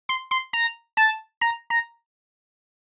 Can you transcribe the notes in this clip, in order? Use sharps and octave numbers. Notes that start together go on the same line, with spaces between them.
C6
C6
A#5
A5
A#5
A#5